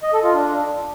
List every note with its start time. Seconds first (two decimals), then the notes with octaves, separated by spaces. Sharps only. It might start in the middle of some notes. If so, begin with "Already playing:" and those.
0.03 D#5
0.13 A4
0.24 F4
0.34 D4